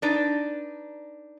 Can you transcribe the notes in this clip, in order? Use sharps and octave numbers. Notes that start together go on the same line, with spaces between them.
D4 D#4 B4 D5